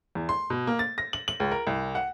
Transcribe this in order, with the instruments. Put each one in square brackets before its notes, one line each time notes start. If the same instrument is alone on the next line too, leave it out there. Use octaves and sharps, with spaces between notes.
[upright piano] E2
C6
B2
A#3
A6
A#6
F#7
F#7
C#2
A#4
C2
F#5